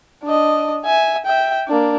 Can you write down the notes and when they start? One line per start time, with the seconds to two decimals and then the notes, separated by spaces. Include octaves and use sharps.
0.24 D4 D#5
0.85 E5 G#5
1.26 E5 G5
1.68 A#3 D4